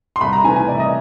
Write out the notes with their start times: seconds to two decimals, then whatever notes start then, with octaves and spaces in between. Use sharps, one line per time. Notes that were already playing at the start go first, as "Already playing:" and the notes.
0.16 C6
0.21 C2 B5
0.33 A#5
0.44 C3 E3 A3 G#5
0.56 G#5
0.68 C2 D5
0.75 E5
0.79 D#5